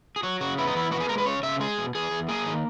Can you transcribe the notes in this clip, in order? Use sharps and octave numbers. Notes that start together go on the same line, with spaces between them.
G#4
F#3 F#4
C#3 F#4
B3 E4
D#4
E2 E4
B3 F#4
G#4
G#3 A#4
B4
C#3 C#5
C#3 E5
G#3 G#4
B2
E2 G#4
E2
A#3 G#4
D#3